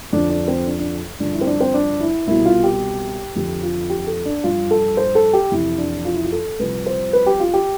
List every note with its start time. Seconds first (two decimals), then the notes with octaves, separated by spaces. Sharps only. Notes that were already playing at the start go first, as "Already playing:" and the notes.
0.13 F2 D3 F3 D4
0.30 D4
0.48 C4
0.66 D4
0.79 D4
1.20 G2 D3 F3 D4
1.33 E4
1.41 C4
1.47 D4
1.60 C4
1.74 D4
2.00 E4
2.27 C2 B2 E4
2.45 F4
2.63 G4
3.35 F2 D3 F3 G4
3.63 F4
3.90 G4
4.07 A4
4.26 D4
4.44 G2 F3 F4
4.71 A4
4.97 C5
5.15 A4
5.33 G4
5.51 F2 C3 E3 E4
5.78 D4
6.05 F4
6.14 E4
6.23 F4
6.32 A4
6.59 C2 C3 F3 B4
6.86 C5
7.13 B4
7.26 G4
7.40 F4
7.54 G4